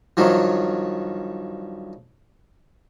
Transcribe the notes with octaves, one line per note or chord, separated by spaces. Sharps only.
G2 D#3 F3 F#3